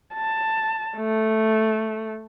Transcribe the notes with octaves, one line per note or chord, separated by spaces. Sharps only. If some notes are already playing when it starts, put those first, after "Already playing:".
A5
A3